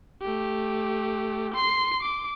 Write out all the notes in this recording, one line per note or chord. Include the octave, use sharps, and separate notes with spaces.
A3 G4
C6 C7
D6